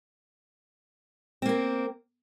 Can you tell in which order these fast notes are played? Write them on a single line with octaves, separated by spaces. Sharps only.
C4 A#3 A#4